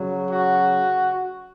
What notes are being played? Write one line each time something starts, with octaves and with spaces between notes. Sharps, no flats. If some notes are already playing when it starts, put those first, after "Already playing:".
Already playing: C#3 F#3
F#4